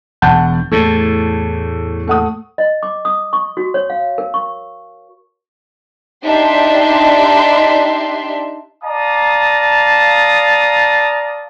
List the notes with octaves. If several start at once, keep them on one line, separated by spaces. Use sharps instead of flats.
E1 F#5 A5 G6
E2 A2 A3
A3 F#5 D#6
D#5
D6
D#6
C#6
F#4
C#5
F5
A#4
C#6
D4 D#4 G4 E5 C6
D5 F5 A5 A#5 D#6